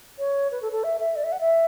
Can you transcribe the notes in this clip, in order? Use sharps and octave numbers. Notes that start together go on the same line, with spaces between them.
C#5
B4
A4
A4
E5
E5
D5
E5
F#5
E5